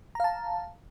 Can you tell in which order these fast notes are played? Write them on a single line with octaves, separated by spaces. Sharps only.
A#5 F5 A5